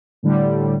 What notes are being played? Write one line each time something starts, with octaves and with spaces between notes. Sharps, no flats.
A2 D3 G3